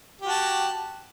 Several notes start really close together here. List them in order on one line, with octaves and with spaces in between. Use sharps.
G4 F#4 A5